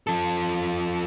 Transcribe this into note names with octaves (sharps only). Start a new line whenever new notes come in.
F3 A4